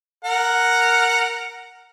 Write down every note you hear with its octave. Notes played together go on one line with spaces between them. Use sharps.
A#4 F#5